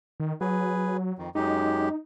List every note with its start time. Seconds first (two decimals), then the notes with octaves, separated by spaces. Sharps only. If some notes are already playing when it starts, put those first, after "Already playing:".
0.20 D#3
0.41 F#3 G#4 B4
1.19 F2 D#3
1.35 F#2 G#3 D#4 G4